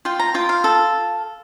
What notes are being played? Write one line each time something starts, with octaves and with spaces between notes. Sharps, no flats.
F4 G5
A#5
F4 G5
F5
A4